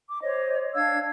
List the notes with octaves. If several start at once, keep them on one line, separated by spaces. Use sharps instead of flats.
D6
C5 C#5 D#5
D4 F5 E6 G#6